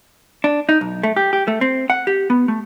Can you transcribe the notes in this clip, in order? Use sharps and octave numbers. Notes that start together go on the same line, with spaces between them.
D4
D#4
B1
A3
G4
G4
A3
C4
F#5
G4
B3
A3